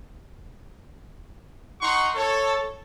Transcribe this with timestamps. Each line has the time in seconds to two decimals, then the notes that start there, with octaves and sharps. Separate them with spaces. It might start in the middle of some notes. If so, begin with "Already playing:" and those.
1.81 D#4 F#5 C6 C#6
2.15 A4 C#5